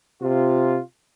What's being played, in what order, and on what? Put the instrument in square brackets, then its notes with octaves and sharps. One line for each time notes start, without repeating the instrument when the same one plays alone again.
[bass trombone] C3 [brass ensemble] F4